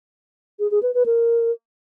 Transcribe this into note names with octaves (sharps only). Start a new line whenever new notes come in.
G#4
G#4
B4
B4
A#4